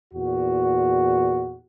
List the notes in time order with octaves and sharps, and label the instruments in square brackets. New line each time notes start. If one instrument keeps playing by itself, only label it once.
[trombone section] E2 A#2 F#4